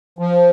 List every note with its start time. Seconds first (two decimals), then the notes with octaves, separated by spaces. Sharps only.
0.19 F3